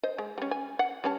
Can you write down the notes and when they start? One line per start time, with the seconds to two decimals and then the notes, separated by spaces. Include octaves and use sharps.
0.03 C5 D#5
0.18 G#3
0.38 G3 C#4
0.51 G#5
0.79 F#5
1.04 G3 C#4 A5